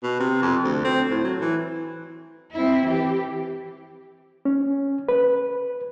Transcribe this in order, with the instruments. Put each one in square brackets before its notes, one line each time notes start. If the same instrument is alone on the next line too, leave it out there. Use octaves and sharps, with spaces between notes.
[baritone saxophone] B2
C3
F2
D2
C4
A2
F#3
E3
[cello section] C4 E4
E3 G4
[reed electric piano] C#4
B4